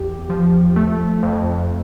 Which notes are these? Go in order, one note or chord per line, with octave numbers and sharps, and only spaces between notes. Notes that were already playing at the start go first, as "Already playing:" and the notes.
Already playing: E2 G4
F3
A3
F2